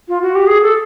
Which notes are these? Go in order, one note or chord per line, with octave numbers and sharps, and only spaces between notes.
F4
F#4
G4
G#4
A4